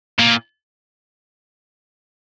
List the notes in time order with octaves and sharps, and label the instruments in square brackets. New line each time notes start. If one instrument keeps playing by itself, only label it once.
[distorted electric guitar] A#2